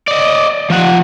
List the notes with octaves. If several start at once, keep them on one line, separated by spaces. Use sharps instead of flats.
D5 D#5
F3 F#5